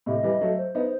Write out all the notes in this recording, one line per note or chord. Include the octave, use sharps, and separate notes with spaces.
A2 C3 D#5
E3 G3
F#3 A3
C5
B3 D#4